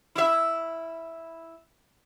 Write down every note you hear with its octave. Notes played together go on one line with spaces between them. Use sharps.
E4 E5